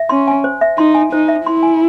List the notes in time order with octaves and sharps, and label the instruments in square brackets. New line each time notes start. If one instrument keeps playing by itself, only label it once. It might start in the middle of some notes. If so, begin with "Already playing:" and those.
Already playing: [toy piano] E5
[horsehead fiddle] C#4 [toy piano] C6
[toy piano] G#5
C5
E5
[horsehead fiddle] D#4 [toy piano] C6
[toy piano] G#5
[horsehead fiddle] D#4 [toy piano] C5
[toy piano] E5
[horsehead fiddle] E4 [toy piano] C6
[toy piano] G#5